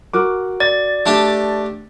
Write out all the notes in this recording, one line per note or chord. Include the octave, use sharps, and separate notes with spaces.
F#4 A#4 D6
D5 A6
A3 D4 G4 A5